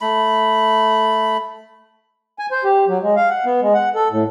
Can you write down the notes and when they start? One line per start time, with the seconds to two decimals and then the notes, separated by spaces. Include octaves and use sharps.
0.01 A3 B5
2.39 G#5
2.51 C5
2.64 G4
2.88 F#3
3.02 G#3
3.16 F5
3.30 F#5
3.45 B3
3.61 G#3
3.74 F#5
3.96 A4
4.11 A2